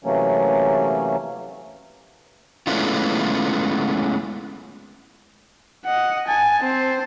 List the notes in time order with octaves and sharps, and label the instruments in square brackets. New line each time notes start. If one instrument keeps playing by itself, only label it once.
[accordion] C3 E3 F#3 A3 A#3 C#4
[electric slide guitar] G#3 A3 B3 C#4 E4 F4
[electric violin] D#5 F#5
[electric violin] G#5 [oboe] A5
[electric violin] C4 C5